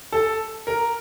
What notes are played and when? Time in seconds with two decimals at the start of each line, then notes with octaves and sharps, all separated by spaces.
0.12 A4
0.67 A#4